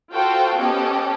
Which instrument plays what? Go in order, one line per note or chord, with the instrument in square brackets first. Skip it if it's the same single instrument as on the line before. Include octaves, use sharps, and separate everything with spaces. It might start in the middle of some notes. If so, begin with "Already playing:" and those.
[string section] F4 F#4 A4 C5 G5
B3 C#4 G4 A4 D#5